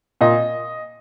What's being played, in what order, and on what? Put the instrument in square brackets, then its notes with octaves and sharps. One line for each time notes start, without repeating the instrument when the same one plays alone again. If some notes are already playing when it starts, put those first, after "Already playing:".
[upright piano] A#2 D#5